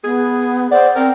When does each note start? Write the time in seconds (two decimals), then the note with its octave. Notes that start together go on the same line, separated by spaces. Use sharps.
0.04 B3 G#4
0.72 C5 D5 F#5
0.96 C4 A#4 G5